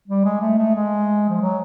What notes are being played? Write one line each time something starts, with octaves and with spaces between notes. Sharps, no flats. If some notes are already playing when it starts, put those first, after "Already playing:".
G3
G#3
A3
A3
G#3
F3
F#3